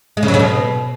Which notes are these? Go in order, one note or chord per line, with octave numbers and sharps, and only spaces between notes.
G#3
C#3
F#3
C#3
B2